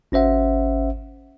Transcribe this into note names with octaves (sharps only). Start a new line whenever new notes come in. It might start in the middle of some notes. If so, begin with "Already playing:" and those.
G#1 C#4 C5 E5 F#5